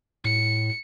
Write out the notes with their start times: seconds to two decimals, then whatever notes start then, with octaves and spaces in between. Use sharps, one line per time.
0.25 A2 C#7